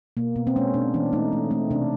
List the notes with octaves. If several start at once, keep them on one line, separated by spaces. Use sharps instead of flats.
B2 A#3
B2 B3
C4
G#3 C#4
B2 D4
E3 D4
A3 D#4
A3
A3 C4
C3 D4